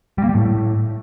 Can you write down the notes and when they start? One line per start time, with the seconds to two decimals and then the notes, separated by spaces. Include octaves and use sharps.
0.18 G3
0.24 A#3
0.29 G3
0.35 A2